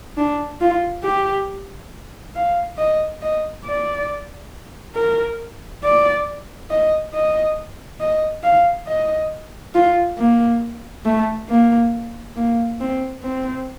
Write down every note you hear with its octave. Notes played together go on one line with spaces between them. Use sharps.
D4
F4
G4
F5
D#5
D#5
D5
A#4
D5
D#5
D#5
D#5
F5
D#5
F4
A#3
A3
A#3
A#3
C4
C4